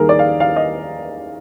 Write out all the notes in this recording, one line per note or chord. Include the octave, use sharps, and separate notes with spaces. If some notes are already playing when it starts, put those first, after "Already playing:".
Already playing: D#2 D#3 G3 A#3 G#4 A#4
D5
F5
F5
D#5